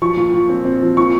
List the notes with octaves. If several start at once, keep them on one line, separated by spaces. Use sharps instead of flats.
F3 C#6
A#2
A#2
C4
C4
F3
A#2 C#6